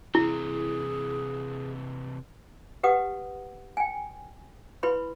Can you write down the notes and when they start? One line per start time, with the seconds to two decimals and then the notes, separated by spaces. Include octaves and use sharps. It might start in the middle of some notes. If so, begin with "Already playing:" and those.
0.15 C3 E3 E4 G#4
2.83 G4 B4 F#5 D#6
3.77 G5 G#5
4.83 E4 B4 B5 C6